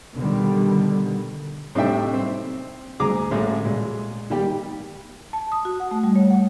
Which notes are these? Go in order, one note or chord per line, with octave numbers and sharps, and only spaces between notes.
B2 D3 D#3 G3
A2 C3 D4 D#4 E5 G5
C4
D2 G#4 A#5 D6
A1 A2 G#3
A#2 G#3
D#3 G3 G4
A5
D#6
F#4
F#5
A3
G3
C#5
F#5